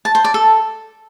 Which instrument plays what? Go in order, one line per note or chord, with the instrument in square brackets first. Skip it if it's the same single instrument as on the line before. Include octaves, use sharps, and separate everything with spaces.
[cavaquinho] A5
C5
D5
A4